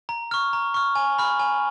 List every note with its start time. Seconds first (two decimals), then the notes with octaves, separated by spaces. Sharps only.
0.09 A#5
0.31 C#6 F6
0.53 A#5
0.74 C#6 F6
0.95 G#5
1.18 B5 F6
1.39 G#5